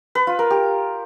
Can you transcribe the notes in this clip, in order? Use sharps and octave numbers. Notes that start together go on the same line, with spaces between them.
B4
F4
A#4
G4